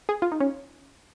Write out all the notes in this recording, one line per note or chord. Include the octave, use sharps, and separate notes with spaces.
G#4
F4
D#4
C#4